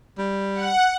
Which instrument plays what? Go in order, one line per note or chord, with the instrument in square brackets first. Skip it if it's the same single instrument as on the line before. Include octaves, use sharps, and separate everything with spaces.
[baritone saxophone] G3
[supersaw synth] F#5